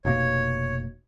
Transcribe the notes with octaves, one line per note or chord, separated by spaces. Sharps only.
F1 B2 A#3 C#5